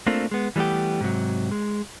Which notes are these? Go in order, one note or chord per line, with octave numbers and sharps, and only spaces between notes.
A3 A#3 C4 D4 F4
G#3 B3
E3 G3 A3 B3 G4
G#2 C3 F#3
G#3